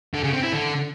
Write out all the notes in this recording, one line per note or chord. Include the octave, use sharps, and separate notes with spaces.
D3
C#3
C4
E4
D3